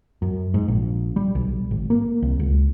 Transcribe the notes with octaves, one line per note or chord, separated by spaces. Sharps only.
F#2
G#2
A#1
G3
B1
G#1
A#3
C2
C#2